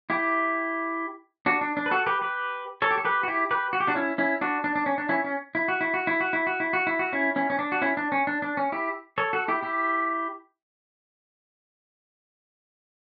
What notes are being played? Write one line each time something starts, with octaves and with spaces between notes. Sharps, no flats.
E4 G4
D4 F#4
D4
D4
B4
F#4 A4
G4 B4
G4 B4
A4 C#5
G4
A4
G4 B4
F#4
E4 G4
G4 B4
F#4
G4
D4 F#4
C#4 E4
C#4 E4
D4 F#4
D4
D4
C#4
D4
C#4 E4
C#4
E4
F#4
E4
F#4
E4
F#4
E4
F#4
E4
F#4
E4
F#4
C#4 E4
C#4 E4
C#4
D4
F#4
C#4 E4
D4
C#4
D4
D4
C#4
E4 G4
A4 C#5
F#4 A4
E4 G4
E4 G4